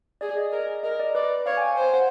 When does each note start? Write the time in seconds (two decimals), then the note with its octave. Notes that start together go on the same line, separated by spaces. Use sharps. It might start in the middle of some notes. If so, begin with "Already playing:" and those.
0.21 G#4 D5
0.37 D#5
0.52 A#4
0.83 A#4 D#5
1.00 D5
1.15 B4 D5
1.46 C#5 F5
1.57 G#5
1.61 G5
1.77 C5
1.93 F#5